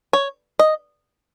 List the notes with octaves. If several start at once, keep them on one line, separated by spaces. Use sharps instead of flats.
C#5
D#5